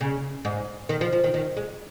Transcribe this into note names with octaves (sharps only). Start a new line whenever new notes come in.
C#3
G#2
D#3
F3
F3
D#3
D#3
G#3